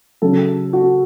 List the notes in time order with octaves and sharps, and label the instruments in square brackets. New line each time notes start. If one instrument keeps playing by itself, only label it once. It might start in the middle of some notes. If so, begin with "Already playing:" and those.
[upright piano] C#3 F#3 A4
F#4